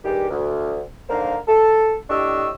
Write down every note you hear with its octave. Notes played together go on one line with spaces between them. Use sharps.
G2 D#3 G3 G#3 G4
D2
D3 D#3 A#3 A#4 C5 F5
A4
A2 D4 G4 D#5 C#6 E6